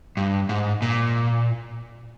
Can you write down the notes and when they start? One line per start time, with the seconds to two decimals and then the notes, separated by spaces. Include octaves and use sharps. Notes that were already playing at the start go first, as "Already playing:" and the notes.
0.17 G2
0.49 G#2
0.82 A#2